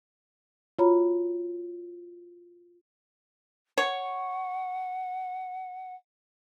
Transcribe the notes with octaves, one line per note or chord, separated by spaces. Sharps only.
F4 F#4 C#5 A#5 B5
C#5 F#5